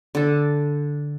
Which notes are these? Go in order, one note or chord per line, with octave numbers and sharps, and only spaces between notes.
D3 A4